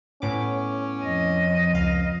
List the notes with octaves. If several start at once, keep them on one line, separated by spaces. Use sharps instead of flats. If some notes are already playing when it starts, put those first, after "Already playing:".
A2 B3 C#4 D6
F2 D#5
C#2 F5